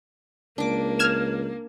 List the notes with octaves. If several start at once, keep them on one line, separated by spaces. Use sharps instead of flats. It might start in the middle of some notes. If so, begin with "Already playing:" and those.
C#2 A#3 D4 D6
F6 G#6 E7